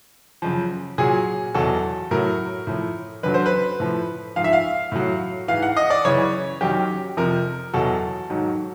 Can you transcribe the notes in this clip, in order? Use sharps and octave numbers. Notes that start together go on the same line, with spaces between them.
F#2 C#3 F3
A#2 F#3 G#4
E2 B2 F#3 A4
A2 F#3 A#4
A2 F3
F#2 D3 F#3 B4
C5
B4
A2 F3
G#2 F3 F5
E5
F5
A2 F#3
G#2 E3 F5
F#5
D#5
D5
F#2 C#3 E3 C#5
F#2 D#3 F#3 G4
F2 C3 F3 A#4
E2 B2 F#3 A4
G#2 D#3 F#3